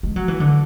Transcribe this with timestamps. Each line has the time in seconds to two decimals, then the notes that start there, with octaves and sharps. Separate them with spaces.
0.03 G#3
0.16 F#3
0.28 E3
0.40 D3